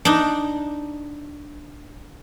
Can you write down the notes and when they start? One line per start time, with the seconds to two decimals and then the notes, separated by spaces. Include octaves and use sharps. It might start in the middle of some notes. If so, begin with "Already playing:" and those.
0.05 D4 D#4